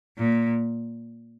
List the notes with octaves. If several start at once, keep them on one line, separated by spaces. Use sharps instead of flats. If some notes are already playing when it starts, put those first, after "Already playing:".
A#2